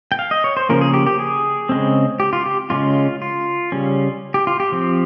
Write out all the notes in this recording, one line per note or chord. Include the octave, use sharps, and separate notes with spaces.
G5
F5
D#5
C#5
C5
C#3 F3 A#3 C#4 A#4
G#4
G4
G4
G#4
C#3 G#3 C4
G4
F4
G4
C#3 G#3 C#4 F4
F4
C#3 G3 C#4
G4
F4
G4
F3 C4